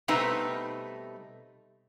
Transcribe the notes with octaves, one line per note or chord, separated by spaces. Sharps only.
B2 G3 A3 C4 D#4 B4